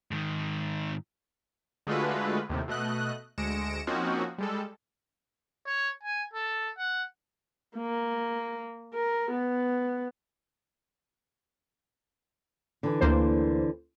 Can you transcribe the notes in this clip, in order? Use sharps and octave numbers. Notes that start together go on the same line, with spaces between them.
G#2 D#3
D3 G#3 A3 F4 F#4 B4
D#2 A2 C3
B2 A3 D#5 F#6
D2 G#3 A#6 C#7 D7 E7
F3 A#3 C4 C#4 D#4 F#4
G3 G#3 A4
C#5
G#5
A4
F#5
A#3
A#4
B3
D3 E3
D2 A#3 C5